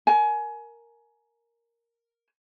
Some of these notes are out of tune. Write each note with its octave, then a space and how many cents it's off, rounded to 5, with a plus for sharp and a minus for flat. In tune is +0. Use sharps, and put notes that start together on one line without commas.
A#4 +0 G#5 +25